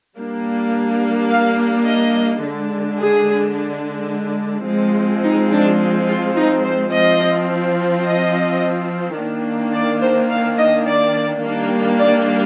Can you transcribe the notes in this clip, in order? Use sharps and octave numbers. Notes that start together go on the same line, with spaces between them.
G3 A#3 D4
F5
D#5
D3 G#3 D4
G#4
F3 G#3 C4
D#4
D4
F4
D#4
C5
F3 C4 D#5
D#5
D#3 A#3 D4
D5
C5
F5
D#5
D5
D#3 G3 A#3 D4
D5